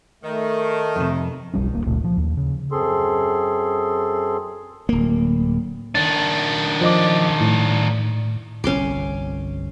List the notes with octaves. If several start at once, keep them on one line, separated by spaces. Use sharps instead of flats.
D#3 A3
F2 C3
E1 B1 G3 C#4
D1 A#3
F#1 C#2 A#2 A3
F3
D#2
C#3
F#2 C4 G#4 A4 C6
D1 A#3
D#3 D4 A6
F3 D#5 D6
A2
G1 C2 C#4 C6 D6